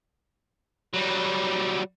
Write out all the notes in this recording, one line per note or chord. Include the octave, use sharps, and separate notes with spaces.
F#3 G3